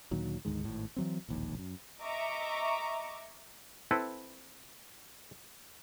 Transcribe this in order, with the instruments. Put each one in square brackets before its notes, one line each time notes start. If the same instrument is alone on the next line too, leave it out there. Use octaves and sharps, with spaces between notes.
[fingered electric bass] D2 A#2 D#3 F#3
D2 G#2 D#3 G#3
G#1 A2
E3 F#3 C4
E1 A#1 D#2
F#2
[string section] D#5 E5 A#5 C#6 D6
[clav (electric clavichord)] C4 E4 A4 B4